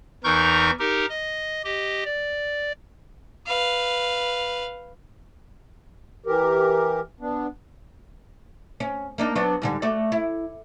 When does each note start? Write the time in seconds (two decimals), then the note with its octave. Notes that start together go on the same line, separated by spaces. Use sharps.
0.24 E2 E3 D#4 A#4 C#6 G6
0.79 D#4 G4 A#4
1.09 D#5
1.64 G4 D#5
2.05 D5
3.47 B4 F5
6.26 E3 G4 A#4
7.20 B3 D4
8.80 C#4
9.18 A#3 D4 D#4
9.35 F#3 B3 D4
9.62 G#2 D3 G3
9.82 A3 F#4 D5
10.12 E4